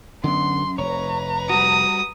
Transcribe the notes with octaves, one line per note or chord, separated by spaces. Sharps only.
F#2 D3 B3 C6
F1 B4 C#5 A#5
G3 F#4 D#6